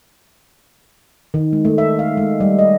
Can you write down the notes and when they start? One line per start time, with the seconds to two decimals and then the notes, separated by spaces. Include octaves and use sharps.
1.34 D#3
1.53 G#3
1.65 A3
1.78 E5
1.99 F5
2.17 G#3
2.40 G3
2.59 D#5